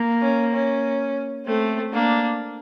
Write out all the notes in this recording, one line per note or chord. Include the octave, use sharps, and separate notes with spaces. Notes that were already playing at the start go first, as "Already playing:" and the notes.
Already playing: A#3
C#4
C#4
A3 C4
A#3 D4